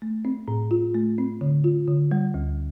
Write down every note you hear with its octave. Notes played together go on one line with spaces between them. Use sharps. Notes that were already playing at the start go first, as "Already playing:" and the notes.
A3
C4
A2
F4
A3
C4
D3
F4
D3
G3
D2